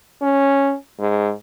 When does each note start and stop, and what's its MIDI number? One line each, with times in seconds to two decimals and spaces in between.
0.22 0.75 61
1.00 1.32 44